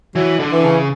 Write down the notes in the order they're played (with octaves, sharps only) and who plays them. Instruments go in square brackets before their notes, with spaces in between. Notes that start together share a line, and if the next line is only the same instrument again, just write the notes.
[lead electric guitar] E3 [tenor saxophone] F#3
[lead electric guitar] D3
[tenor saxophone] E3
[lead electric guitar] C#3